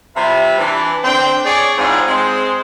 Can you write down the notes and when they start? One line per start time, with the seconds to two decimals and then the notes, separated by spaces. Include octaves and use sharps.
0.16 C3 G3 F4 B4 E5
0.59 E3 D4
1.04 D3 C4 D4 G5
1.45 G#4 C#5 D5
1.77 G#2 C4 D4 E4 F4 G#4
2.08 G#3 C4